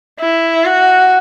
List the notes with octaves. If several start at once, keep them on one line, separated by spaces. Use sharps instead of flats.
E4
F#4